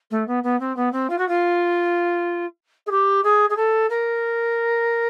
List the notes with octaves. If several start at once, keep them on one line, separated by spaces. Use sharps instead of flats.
A3
B3
B3
C4
B3
C4
F4
F#4
F4
G#4
G4
G#4
G#4
A4
A#4